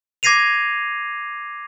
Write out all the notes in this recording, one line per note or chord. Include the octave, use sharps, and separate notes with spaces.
D6 G#6 A#6 C7 D#7 F7